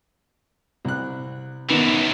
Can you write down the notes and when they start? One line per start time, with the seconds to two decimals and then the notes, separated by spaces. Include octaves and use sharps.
0.85 C2 F#6
1.70 F#2 D#3 E3 B3